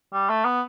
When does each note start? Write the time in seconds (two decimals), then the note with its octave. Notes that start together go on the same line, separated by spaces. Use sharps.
0.13 G3
0.29 A3
0.45 B3